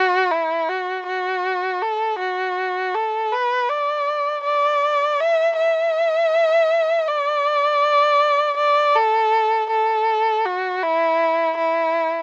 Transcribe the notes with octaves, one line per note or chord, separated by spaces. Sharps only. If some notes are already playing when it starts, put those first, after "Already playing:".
Already playing: F#4
E4
F#4
F#4
A4
F#4
A4
B4
D5
D5
E5
E5
D5
D5
A4
A4
F#4
E4
E4